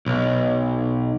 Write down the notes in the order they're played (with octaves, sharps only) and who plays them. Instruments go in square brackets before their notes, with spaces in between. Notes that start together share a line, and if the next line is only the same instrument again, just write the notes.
[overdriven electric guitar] B1